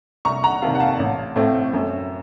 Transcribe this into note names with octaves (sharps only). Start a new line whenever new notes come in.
C2 A#5 C#6
F#5 A#5
C3 D#3 F5 A5
F#5
F5 A5
A1
A2 A3 C4
F#2